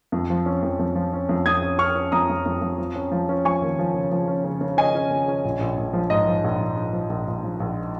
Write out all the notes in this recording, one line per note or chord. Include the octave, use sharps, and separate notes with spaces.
F2
F3
C#4
F2
F2
F3
C#4
F2
F2 D#6 G#6
C#4
C#4 C#6 F6
C#4
F2 A#5 D#6
F2
F2
F2
F3
C#4
F3
C#4
F3 G#5 C#6
D#2
F3
C#3
F3
C#4
C#3
C#3
C#4 D#5 G#5
C#4
C#3
C#4
A#1
A#1
A#1
F3
G#2 D#5
F3
A#1
A#1
A#1
F3
A#1
A#1
F3
A#1